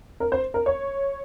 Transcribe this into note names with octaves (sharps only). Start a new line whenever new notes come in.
A#4
C5
A#4
C#5